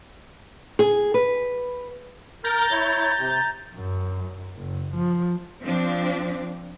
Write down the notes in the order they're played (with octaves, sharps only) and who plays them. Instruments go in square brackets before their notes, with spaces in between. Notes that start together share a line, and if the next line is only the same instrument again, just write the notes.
[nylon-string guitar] G#4
B4
[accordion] A#4 [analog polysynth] A#5 G6 A6
[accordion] E4 C#5
C3
[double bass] F#2
F#1
F3
[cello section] F3 C4 D4